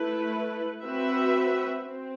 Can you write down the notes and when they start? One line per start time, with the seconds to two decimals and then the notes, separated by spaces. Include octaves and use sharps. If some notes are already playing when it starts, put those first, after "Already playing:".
Already playing: A3 E4 B4
0.82 C4 F#4 B4 E5
1.84 C4